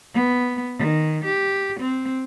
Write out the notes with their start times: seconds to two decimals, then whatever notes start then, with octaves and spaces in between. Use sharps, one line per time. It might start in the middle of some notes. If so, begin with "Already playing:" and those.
0.14 B3
0.78 D#3
1.25 G4
1.80 C4